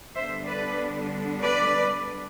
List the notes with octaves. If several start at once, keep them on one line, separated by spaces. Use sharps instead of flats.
D3 G3 B3 D4 C5 E5
B4 D5
B4 D5